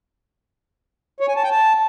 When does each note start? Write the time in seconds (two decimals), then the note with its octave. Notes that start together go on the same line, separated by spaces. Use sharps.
1.20 C#5
1.28 G#5
1.36 A5
1.44 G5
1.51 A5